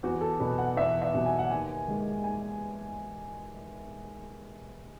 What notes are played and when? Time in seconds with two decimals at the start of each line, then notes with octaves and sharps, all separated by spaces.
0.03 E2 F#4
0.21 A4
0.39 B2 F#3 B4
0.58 F#5
0.76 E2 E5
1.02 E5
1.14 B2 F#3
1.26 G#5
1.39 F#5
1.50 D#2 G#5
1.88 D#3 G#3
2.24 D#2 G#5